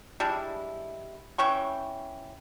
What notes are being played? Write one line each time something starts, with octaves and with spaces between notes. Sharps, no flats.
G3 G#3 D4 E4
E3 C#4 G5 C#6